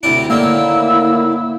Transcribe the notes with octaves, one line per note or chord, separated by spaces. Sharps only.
D2 C3 D4 E4 D7
A2 D3 D#3 A#3 E6